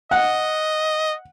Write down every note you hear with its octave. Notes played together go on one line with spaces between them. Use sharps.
D#5 F#5